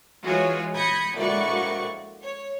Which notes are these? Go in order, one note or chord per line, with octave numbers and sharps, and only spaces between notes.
E3 G#3 F4 F#4 G#4 C#5
B5 D#6 G6 G#6 A#6 C#7
A#1 A2 G#3 F#4 D5 C#6
C#5